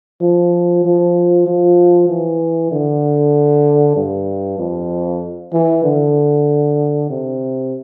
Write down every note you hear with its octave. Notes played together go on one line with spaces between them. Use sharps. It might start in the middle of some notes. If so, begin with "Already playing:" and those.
F3
F3
F3
E3
D3
G2
F2
E3
D3
C3